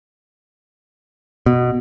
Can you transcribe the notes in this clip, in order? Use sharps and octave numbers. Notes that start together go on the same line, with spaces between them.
B2